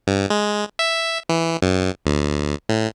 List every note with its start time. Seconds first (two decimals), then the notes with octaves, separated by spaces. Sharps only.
0.07 G2
0.30 G#3
0.79 E5
1.29 E3
1.62 F#2
2.06 D2
2.69 A2